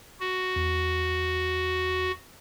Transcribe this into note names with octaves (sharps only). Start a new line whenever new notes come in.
F#4
E2